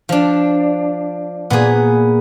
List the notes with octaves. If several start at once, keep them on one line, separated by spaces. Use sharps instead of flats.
F3 D4
A#2 A#3 B3 G#4 B4